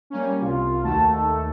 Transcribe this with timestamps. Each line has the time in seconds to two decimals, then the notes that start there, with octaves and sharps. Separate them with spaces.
0.10 G3 A#3 C#4
0.41 C2 F4
0.83 D#2 A3 F#4 A5
1.13 D#4 A4